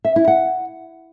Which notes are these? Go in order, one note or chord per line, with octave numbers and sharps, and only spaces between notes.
E5
E4
F#5